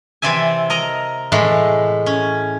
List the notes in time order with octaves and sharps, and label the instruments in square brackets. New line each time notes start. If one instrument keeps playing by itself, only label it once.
[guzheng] C3 E3 C4 D5 E5 G#5
A#4 D#5 A#5
A2 E3 G#3
C#4